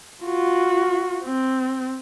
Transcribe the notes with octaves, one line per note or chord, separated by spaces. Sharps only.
F4 F#4
C4